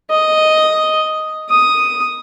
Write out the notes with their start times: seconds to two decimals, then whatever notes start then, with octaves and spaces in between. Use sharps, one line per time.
0.10 D#5
1.50 D#6